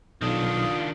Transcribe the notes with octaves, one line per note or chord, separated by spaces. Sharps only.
B1 D#3 D4 F4 D#6